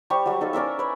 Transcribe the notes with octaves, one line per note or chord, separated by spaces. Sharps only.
G3 G4 C5 C#6
F#3 G3
D#4 A4 F5
C#4 A#4 D5 E5
B4 C#5